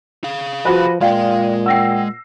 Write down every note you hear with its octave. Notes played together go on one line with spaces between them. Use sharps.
G#4 F5
F3 F#4 B4
A#2 G#3 F4 D5 F5 G5
F#5 G5 E6 A#6 C7